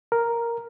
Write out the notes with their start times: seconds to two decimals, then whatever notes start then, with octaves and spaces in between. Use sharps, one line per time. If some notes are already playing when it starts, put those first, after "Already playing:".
0.12 A#4